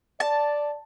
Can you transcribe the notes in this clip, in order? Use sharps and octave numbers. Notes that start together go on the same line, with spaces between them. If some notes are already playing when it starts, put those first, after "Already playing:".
D5 A5